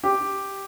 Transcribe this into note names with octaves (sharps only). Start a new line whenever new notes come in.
G4